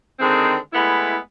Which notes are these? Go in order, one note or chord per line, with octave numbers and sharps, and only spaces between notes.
D3 D#3 G#3 C4
G#3 A3 B3 E4